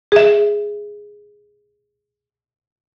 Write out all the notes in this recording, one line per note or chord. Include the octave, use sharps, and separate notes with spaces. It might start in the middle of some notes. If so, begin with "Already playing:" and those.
G#4 E5